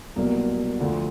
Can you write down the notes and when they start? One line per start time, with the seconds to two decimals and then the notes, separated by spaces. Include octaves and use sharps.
0.16 C2 B2 F#3 A#3
0.80 D2 D3 F3